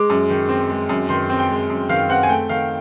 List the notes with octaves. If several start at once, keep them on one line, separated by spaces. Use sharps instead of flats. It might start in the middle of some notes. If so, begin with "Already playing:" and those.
Already playing: G#3 D6
F#2
D#3
C4
G#3
F#2
D#3 C6
C4
G5
G#3
F#2
D#3 F5
C4 F#5
G#5
A3 G5
D#3 F5